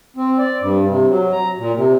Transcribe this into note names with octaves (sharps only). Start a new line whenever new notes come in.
C4
D5
G2
C3
F#3
A#5
A#2
C3